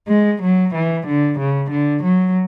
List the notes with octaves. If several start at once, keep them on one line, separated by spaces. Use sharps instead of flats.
G#3
F#3
E3
D3
C#3
D3
F#3